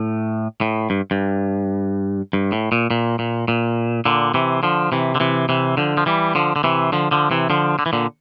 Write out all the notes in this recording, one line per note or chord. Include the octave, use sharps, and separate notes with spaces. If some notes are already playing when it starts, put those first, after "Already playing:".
Already playing: A2
A2
G2
G2
G2
A2
A#2
A#2
A#2
A#2
A#2 D3
C3 E3
D3 F3
C3 E3
D3
C3 E3
C3 E3
D3 F3
F3
E3 G3
D3 F3
D3
C3 E3
D3 F3
D3 F3
C3 E3
D3 F3
D3
E3
A#2 D3